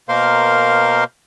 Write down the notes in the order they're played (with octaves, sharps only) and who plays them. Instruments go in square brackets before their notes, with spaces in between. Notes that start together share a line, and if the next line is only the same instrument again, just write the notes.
[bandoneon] B2 A#3 A#4 C5 F5 C6